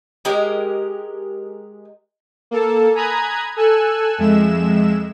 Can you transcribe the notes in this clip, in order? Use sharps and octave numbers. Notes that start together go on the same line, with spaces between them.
G#3 G4 A#4 D#5
A#3 A4 A5
G#5 A#5 B5 D#6 F#6 G#6
A4 G#5 E6 F#6
F2 G#3 E5 E7